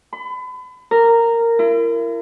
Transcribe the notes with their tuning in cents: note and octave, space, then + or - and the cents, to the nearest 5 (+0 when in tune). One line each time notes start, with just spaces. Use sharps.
B5 +35
A#4 -10
E4 +40